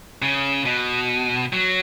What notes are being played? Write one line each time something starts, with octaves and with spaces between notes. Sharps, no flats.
C#3
B2
F#3